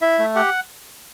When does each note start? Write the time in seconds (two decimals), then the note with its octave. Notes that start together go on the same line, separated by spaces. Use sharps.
0.02 E4 E5
0.19 A3
0.36 G4 F#5